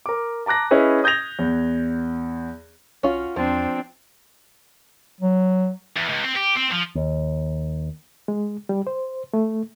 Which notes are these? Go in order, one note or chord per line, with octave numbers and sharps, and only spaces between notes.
A#4 D6
A5 A#5 D6 F#6 A#6
C#4 E4 G#4 B4 D#5
D#6 G6 G#6 A#6 F7
E2
B1 C#4 F4 F#4
E2 F3 C4 D4
F#3
E2
C#2
C4
G4
C4
F3
D#2
G#3
G3
C5
A3